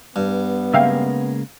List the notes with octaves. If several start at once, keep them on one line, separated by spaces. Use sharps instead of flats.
G2 B3
C#3 G#3 A#3 E5 F5 G5